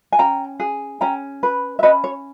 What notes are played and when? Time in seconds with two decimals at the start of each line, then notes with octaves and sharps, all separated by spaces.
0.12 G#5
0.19 C#4 G5 A#5
0.60 G#4
1.01 C#4 G5 A#5
1.43 B4
1.79 E5
1.83 C#4 B4 D#5
2.04 C#5